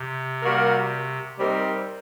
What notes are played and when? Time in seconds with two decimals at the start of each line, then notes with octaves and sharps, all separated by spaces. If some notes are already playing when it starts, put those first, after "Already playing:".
Already playing: C3
0.43 G3 A#3 F#4 A#4
1.38 G3 C4 D#4 G4 A#4